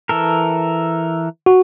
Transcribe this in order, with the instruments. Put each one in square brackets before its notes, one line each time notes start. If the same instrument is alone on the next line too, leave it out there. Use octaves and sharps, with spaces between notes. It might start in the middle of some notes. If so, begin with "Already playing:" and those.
[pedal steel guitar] E3 A4 A#4
[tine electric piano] F#4